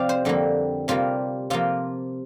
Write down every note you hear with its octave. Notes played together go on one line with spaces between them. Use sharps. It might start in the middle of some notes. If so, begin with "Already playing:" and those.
Already playing: C3 F3 C4 D5 F5 G5
C5
F2 D3 G3 A#3
C3 G3 A#3 F4
C3 F3 A#3 F4